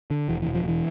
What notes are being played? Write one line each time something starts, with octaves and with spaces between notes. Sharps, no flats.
D3
E1 E3
E3
E1
F3
E1 E3